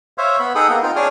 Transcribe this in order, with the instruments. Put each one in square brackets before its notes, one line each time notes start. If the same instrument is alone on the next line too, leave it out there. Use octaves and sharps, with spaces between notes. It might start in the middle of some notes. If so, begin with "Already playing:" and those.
[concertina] C5 C#5 E5 F5
B3 B5
D#4 G#4 A4 F#5 G5 D#6
A#3 B3
C4 D#4 F4 G5
D4 G#4 C#5 D5 D#6 F6